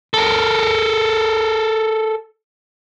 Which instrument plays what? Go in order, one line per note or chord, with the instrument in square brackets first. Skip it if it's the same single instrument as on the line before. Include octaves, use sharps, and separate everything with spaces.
[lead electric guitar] A4 A#4